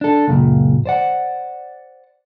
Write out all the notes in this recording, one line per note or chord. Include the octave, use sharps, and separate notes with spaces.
D4 A4
C#2 F#2 A#2
C5 D5 F#5